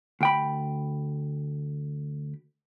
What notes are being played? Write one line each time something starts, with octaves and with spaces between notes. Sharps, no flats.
D2 G5 B5